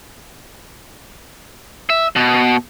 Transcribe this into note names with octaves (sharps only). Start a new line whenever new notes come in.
E5
B2